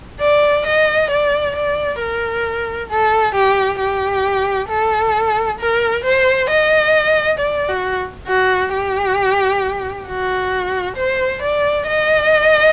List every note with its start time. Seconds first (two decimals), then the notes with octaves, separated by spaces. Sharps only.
0.21 D5
0.66 D#5
1.11 D5
1.56 D5
2.01 A#4
2.90 A4
3.35 G4
3.80 G4
4.69 A4
5.60 A#4
6.05 C5
6.49 D#5
7.39 D5
7.69 F#4
8.27 F#4
8.73 G4
10.07 F#4
10.97 C5
11.42 D5
11.87 D#5